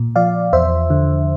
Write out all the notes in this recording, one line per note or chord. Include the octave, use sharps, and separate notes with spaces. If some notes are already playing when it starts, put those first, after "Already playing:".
Already playing: A#2
F3 D5 F5
E2 C5 E5
D3